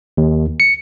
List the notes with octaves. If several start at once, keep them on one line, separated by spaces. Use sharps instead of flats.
D#2
C#7